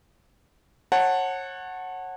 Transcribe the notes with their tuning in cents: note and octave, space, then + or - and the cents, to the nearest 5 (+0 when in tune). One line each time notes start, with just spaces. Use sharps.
C#5 -30 F#5 +0 A5 +10